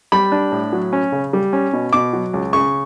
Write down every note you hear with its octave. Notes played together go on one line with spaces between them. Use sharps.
G3 B5
D4
A2
F#3
C#4
C#3
G3
C#4
B2
B2 D6
F#3
C#2
C#3 C#6